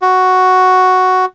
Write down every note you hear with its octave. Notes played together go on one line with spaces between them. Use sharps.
F#4